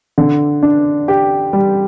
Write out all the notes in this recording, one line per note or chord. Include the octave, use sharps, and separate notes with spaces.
D3
D4
G4
G3